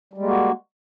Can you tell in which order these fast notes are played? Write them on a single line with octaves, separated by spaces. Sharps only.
G3 G#3 A#3 F#4